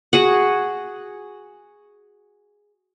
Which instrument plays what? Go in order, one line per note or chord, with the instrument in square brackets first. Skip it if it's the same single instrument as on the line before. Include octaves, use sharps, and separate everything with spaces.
[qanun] F#4 G#4 F#5